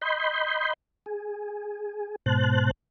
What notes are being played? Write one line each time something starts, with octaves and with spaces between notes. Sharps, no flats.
D#5 B5 C6 G6
G#4
G#2 B2 C5 A5 F#6